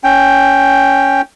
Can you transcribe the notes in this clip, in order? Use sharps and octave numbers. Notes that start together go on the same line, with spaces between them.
C#4 G5